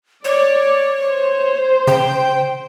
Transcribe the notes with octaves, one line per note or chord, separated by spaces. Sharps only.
C#5 D5
C5
C#3 G5